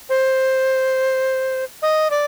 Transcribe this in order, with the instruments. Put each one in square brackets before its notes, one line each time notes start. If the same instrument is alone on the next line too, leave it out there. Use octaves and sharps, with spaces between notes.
[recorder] C5
D#5
D5